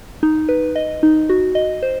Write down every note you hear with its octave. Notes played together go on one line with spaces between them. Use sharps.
D#4
B4
D#5
D#4
F#4
D#5
C5